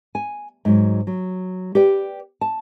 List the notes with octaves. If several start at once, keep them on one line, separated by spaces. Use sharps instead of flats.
G#5
G#2 F#3
F#3
G4 B4 D5 G5
A5